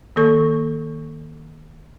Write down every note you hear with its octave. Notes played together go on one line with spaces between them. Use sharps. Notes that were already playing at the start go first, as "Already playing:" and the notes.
D#3 A#3 A4 C#6